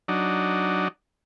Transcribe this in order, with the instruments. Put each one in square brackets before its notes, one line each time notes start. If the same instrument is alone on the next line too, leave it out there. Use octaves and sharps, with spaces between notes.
[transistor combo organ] F#3 D4 D#4